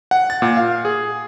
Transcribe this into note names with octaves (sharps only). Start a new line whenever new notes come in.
F#5
A6
A#2
F5
G#4